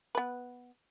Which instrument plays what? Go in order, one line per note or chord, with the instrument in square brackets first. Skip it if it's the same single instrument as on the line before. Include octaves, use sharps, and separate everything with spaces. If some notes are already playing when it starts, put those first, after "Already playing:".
[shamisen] B3 B4